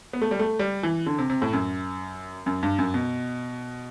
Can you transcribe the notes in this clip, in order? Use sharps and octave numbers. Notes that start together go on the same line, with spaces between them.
B3
A3
G3
A3
G3
E3
D3
C3
C3
A2
F#2
F#2
G2
F#2
B2